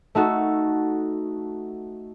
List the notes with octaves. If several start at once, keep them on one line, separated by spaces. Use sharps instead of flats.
A3 D#4 F#4 A4